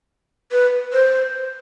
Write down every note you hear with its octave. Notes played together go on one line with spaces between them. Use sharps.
B4
C5